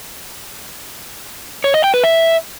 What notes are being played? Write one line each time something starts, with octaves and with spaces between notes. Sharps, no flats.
C#5
D#5
G5
B4
E5